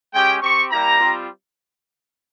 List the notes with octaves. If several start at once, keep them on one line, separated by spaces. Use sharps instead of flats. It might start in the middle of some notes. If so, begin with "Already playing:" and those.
G#3 C#4 G4 G5
C4 G4 C#6
G3 A#3 E4 G4 A#5
G3 C4 F4